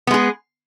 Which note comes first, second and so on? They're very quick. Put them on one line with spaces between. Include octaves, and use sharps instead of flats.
B3 G#3 G#4